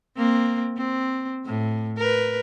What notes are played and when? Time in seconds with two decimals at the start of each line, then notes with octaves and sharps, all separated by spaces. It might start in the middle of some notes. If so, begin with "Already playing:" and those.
0.17 A#3 C4
0.77 C4
1.46 A2
1.98 A#4 B4